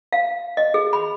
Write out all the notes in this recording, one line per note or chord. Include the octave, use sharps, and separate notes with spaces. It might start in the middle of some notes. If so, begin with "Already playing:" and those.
F5
D#5
G#4
B5